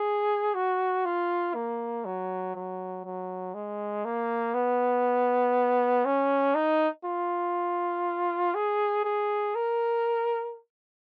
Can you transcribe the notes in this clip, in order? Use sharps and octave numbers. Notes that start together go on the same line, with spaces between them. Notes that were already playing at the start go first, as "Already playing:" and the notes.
Already playing: G#4
F#4
F4
A#3
F#3
F#3
F#3
G#3
A#3
B3
C#4
D#4
F4
G#4
G#4
A#4